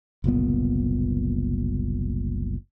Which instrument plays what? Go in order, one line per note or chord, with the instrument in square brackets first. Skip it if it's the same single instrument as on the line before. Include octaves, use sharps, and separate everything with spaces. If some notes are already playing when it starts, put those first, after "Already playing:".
[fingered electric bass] F#1 C2 A#2 B3